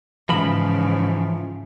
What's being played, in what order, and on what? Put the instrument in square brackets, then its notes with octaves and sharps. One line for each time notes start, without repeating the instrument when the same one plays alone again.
[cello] G#2 C#3 [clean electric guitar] E3 F3 B5